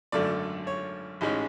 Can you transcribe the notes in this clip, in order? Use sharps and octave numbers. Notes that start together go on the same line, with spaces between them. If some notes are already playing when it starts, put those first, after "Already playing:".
G#1 F#2 D3 A3 D5
C#5
A1 G#2 G#3 C#4